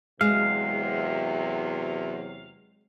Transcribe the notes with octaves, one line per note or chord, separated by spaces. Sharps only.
E2 C3 F#3 G#3 F5